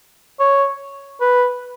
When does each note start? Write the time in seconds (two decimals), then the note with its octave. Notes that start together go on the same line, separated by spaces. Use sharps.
0.40 C#5
1.21 B4